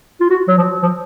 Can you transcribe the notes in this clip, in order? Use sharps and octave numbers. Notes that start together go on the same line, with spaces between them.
F4
F#4
F#3
F3
F3